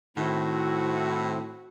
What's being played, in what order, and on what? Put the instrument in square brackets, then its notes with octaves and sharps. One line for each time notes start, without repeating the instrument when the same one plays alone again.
[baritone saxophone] A2 [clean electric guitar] D#3 [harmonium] C4 E4 [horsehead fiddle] F#4